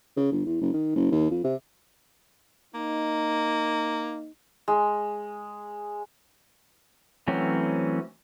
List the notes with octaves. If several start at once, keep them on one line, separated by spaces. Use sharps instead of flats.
C#3
G1
E2
F#1
D#3
F#1
D#2
F2
C3
A#3 D#4
G#3
E3 F#3 A3 C4 C#4